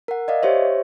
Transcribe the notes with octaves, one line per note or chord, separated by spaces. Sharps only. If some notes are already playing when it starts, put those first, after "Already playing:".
A#4 F#5
D5 D#5 F5
G4 C5 C#5 E5